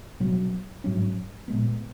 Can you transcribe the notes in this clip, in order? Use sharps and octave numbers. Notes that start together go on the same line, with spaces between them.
B2 F#3 C#4
G#2 F#3 C#4
A#2 G#3 B3